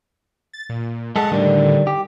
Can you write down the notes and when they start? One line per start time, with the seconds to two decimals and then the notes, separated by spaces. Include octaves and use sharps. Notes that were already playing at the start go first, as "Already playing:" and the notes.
0.53 A6
0.69 A#2
1.16 G#3 A4 F#5
1.31 A2 D3 D#3 G3
1.87 G4